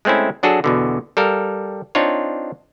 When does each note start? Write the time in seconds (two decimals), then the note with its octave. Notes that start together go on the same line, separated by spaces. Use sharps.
0.05 G#3 A3 C4 C#4 E4
0.43 F#3 D4 F#4 G#4 A4
0.64 E2 B2 D3
1.17 G3 A4 A#4 F5
1.95 C4 D4 D#4 F4 C#5